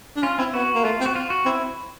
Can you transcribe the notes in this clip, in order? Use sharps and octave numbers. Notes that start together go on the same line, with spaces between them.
D4
C#4 F4
C4 E4
B3 F#4
A#3
A3 F4
C4
F#4
F4
F#4
C4 E4